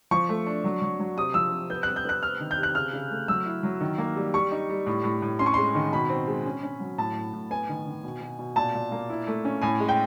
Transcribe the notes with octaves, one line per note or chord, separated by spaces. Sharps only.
F3 C#6
A3
D4
F#3
F#3
F#3
C3 D#6
F3 E6
C3
B3 G6
G3 F#6
G6
B3 F#6
C3 F6
D#3
G6
C3
F#6
C#3 F6
C#3
A3
F#3 E6
E4
F#3
D#3
A#3
G3
G3 C#6
D#4
G3
A2
A2
A2
C#4 C6
C#6
G#3 C6
D#3
B2 B5
C4
G#3
C#4
C#4
F#3
A2 A5
A2
A2
B3 G#5
D#3
D#3
B2
B2
B2
A#2 A5
A#2
A#3
E4
A3
C#4
A2 G#5
G#3
G5